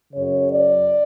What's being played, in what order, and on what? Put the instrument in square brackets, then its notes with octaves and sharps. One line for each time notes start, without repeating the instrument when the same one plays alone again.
[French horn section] F#2 C#3 C#5
D5